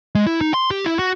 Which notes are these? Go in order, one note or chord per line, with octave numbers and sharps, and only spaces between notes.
G#3
E4
D#4
C6
G4
E4
F#4